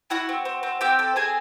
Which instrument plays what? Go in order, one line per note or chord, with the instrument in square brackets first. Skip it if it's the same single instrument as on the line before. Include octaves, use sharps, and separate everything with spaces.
[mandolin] E4 F#4 F#5
C4
C4
C4
C4 G4 G5
A4
C4 G#4 G#5